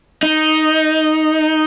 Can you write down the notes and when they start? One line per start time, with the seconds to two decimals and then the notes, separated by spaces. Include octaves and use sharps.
0.23 D#4